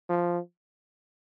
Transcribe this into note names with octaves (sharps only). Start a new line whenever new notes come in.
F3